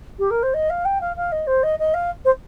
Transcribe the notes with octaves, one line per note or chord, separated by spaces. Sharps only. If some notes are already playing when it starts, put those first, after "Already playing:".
G4
A#4
C5
D#5
F5
G5
F5
F5
D#5
C5
D#5
D#5
F5
C5